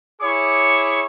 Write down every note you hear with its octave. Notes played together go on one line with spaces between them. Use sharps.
E4 G#4 C#5 C#6 D6